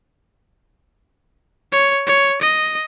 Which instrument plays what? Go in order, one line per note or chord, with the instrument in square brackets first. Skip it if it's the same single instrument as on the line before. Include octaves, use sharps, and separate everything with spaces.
[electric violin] C#5
C#5
D#5